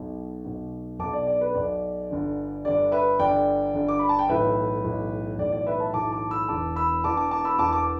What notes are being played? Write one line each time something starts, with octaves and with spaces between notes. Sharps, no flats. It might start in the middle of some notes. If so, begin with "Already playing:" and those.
Already playing: B1 B2
B1 B2
B1 B2 A5 D6
D5
D5
B4
B1 B2 D5
G1 G2 D3
G1 G2 D3 D5
B4 E5
G1 G2 D3 D5 G5
G1 G2 D3
D6
B5
A5
G5
B1 A2 E3 B4 E5
B1 A2 E3
B1 A2 E3 D5
D5
B4 E5
E5 A5
B1 A2 E3 A5 D6
A5 D6
B5 E6
E1 E2 E3 A5 D6
B5 E6
E1 E2 E3 A5 D6
A5 D6
A5 D6
B5 E6
E1 E2 E3 A5 D6
A5 D6